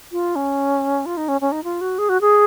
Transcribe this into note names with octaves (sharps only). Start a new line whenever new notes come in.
F4
C#4
F4
D#4
C#4
C#4
D#4
F4
F#4
G#4
F#4
G#4